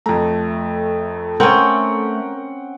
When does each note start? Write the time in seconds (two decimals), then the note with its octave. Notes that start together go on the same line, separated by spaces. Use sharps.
0.06 F2 A3 A#5
1.40 C4 C#4 A#4 F#5 G5